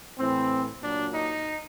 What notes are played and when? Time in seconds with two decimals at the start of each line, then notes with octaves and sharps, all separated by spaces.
0.19 A2 E3 C4
0.81 A#2 F#3 D4
1.13 D#4